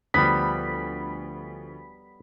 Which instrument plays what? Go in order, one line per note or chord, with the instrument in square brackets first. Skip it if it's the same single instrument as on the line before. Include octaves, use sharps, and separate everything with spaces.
[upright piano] D2 F3 [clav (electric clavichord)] G3 B3 [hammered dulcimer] B5